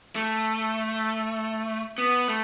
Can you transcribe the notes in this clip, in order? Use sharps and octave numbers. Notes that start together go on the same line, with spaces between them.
A3
B3
A3